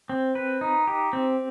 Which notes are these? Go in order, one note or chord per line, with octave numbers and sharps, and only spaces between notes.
C4
B4
D#4
G4
C4